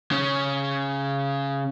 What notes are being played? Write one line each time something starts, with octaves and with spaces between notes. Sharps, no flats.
C#3 C#4